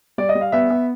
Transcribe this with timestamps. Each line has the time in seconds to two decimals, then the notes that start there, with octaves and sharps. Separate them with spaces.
0.18 G3 D5
0.29 D#5
0.35 G3
0.41 F5
0.52 B3 E5
0.70 B3